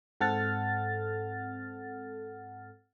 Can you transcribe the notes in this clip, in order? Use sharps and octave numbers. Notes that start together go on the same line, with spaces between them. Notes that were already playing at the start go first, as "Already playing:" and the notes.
G#2 C4 A4 F#5 F6 A6